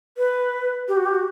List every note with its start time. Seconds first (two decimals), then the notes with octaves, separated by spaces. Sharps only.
0.17 B4
0.88 G4
0.97 F#4
1.06 G4
1.15 F#4